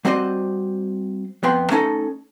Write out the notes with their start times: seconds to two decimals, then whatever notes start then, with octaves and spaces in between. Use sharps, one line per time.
0.05 G3 C4 F#4 C5 D5 D#5
1.43 F2 B3 G5 C6
1.70 A3 C#4 D#4 A4